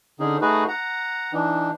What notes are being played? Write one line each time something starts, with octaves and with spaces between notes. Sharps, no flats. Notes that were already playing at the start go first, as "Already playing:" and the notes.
D3 C#4 D#4 G#4
A3 D#4 F#4 G#4 B4
F#5 A#5
E3 D4 D#4